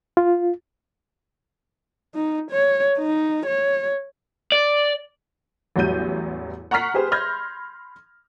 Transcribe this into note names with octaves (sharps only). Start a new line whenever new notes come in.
F4
D#4
C#5
D#4
C#5
D5
A1 E2 F#3 G3 G6 D#7
F#5 A#5 C#6 F6 B6 C7
G4 G#4 B4 C5
B5 C6 F6 G6 G#6 A#6